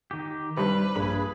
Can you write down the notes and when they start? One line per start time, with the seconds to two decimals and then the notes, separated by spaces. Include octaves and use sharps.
0.11 D#3 G4
0.57 G2 C3 G3 B4
0.96 A#1 G2 G#4 B5